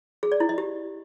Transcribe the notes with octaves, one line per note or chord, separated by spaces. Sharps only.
G#4
D5
E4
D#5
G4